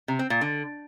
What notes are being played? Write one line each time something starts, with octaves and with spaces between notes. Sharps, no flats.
C3
C4
A#2
D3